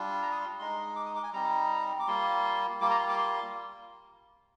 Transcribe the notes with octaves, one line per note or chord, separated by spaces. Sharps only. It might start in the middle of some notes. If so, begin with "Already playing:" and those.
Already playing: G3 D4 F4
A#5
D#6
C6
G#3 D#4 C6
D6
D#6
D6
G#5
G3 C4 D#4 A#5
D6
G3 A#3 F4 C6
G3 A#3 F4 D6
A#5
C6
D6
C6